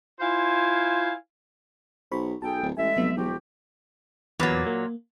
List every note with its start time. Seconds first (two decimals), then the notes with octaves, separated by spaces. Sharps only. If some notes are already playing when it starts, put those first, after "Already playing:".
0.20 E4 F4 C5 F5 G#5
2.12 B1 C5 B5 C#6
2.42 B1 G#4 A4 G5 A5
2.63 D1
2.77 A1 G#3 A4 E5 G#5
2.97 F1 F#3 B3
3.16 E1 F3 F#4 G4
4.40 E2 A#2 F#3 B4 A6
4.67 A#3